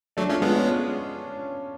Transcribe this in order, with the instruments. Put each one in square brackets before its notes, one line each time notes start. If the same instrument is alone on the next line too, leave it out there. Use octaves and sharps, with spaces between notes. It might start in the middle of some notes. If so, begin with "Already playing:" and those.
[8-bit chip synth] F#3 A3 [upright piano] D4
[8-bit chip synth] A3 C#4 [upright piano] F4
[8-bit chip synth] G#3 B3 [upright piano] F4
[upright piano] C#4